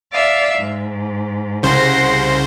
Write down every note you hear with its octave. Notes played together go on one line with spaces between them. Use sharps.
D5 E5 F5
G#2
C2 C#3 C5 F#5 C6 A#6